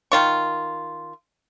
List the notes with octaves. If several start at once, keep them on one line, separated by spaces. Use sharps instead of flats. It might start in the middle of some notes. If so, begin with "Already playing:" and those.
D#3 F4 C#6